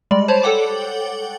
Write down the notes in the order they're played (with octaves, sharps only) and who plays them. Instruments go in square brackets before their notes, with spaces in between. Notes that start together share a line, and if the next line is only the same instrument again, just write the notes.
[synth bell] G3 G#3 D5
C5 C#5 A5 B5
A4 C#5 F#5 G5 D6